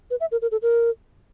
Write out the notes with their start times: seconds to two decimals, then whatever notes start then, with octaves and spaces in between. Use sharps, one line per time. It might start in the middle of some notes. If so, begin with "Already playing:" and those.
0.10 B4
0.21 E5
0.32 A#4
0.42 A#4
0.52 A4
0.62 A#4